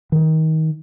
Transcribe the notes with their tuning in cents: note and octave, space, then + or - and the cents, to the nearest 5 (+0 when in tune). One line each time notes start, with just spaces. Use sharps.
D#3 +25